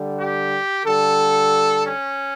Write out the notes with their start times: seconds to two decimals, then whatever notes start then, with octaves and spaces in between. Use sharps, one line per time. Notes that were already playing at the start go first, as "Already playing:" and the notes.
Already playing: D3 G3
0.19 G4
0.85 D3 G3 A4
1.86 C#4